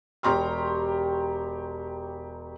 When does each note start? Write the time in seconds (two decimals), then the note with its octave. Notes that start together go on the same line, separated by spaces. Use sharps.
0.23 E1 G4 C#5 A#5 C6 F6